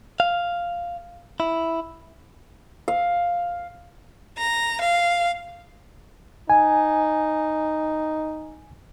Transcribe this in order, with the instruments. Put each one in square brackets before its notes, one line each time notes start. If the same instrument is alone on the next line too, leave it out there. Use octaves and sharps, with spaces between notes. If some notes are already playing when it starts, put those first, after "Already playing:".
[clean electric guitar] F5
E4
[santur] F5
[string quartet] A#5
F5
[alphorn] D#4 [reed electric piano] G#5